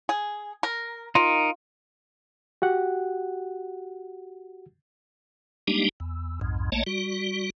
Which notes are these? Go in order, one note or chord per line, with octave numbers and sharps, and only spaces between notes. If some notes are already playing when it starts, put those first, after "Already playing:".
G#4
A#4
D#4 F4 A#4
F#4 G4 F#5
G3 G#3 A#3 D4 D#4 G4
E2
B1 F2 G#2
A#1 A3 A#3 C#5 D#5 A5
G3 F#4